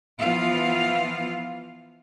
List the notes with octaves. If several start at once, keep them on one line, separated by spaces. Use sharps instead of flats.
E3 F3 B3 F4 F5